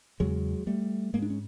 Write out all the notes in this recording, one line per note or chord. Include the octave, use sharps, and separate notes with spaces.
E2 C#3 F#3 G#3
G3 A3
G#2 G#3 A#3
D4
C#4